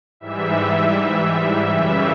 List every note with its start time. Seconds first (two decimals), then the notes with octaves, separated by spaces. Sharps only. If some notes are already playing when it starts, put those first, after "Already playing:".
0.20 G#2 E3 G3 E5
1.71 F#2 C#3 E3 G3 E5